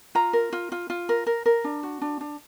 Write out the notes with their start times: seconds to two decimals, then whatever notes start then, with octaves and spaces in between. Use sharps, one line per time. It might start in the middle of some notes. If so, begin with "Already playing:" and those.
0.15 F4 A#5
0.33 A#4
0.53 F4
0.72 F4
0.90 F4
1.09 A#4
1.27 A#4
1.46 A#4
1.64 D4
1.83 F#4
2.01 D4
2.21 D4